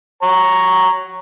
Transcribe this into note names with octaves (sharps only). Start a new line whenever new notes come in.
C#5 A#5